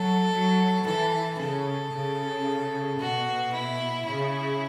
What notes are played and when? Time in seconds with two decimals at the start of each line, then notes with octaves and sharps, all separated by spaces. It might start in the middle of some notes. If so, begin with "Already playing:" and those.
Already playing: F#3 A4
0.32 F#3
0.86 E3 A4
1.38 C#3 A4
1.93 C#3
2.99 B2 F#4
3.52 E4
4.06 C#3 E4